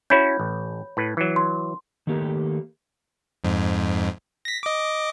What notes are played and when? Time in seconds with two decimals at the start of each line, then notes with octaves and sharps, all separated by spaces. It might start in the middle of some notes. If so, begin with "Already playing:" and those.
0.10 C#4 E4 F#4 C#5 B5 G6
0.39 A1
0.97 A2 B4
1.17 E3 F#3
1.36 C6
2.07 D#3 A3 A#3 G4
3.44 F2 G#2
4.45 A#6 B6
4.63 D#5 D6